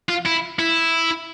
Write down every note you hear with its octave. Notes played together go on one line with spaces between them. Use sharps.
F4
E4
E4